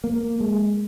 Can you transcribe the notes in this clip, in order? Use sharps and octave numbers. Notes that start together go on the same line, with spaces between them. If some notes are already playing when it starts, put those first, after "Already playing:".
A#3
G#3